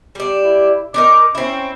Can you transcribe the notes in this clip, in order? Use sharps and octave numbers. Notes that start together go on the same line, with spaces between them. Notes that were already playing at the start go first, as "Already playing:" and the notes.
G3 D4
E4
D4 D#4 A#4 D6
C4 C#4 E4